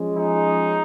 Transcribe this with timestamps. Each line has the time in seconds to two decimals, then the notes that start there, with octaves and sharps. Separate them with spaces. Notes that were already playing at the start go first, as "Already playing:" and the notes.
Already playing: F3 G#3 C#4
0.16 D#4